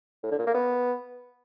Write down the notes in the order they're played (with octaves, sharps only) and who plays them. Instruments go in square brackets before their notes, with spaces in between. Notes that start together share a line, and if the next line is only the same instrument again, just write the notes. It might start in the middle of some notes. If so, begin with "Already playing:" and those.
[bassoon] A2
D3
A#2
A#3
B3